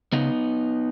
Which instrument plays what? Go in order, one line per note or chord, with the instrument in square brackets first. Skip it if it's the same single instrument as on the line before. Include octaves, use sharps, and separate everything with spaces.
[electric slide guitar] C#3 B3 D#4